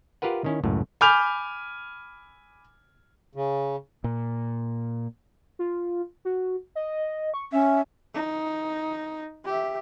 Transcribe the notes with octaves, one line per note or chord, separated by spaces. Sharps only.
F4 G4 A#4 B4 F#5
D#3 C#4 E4
C#2 F#2 A2
G#5 B5 D6 F6 G6 F7
C#3
A#2
F4
F#4
D#5
C#6
C#4 E5
D#4
G4 E5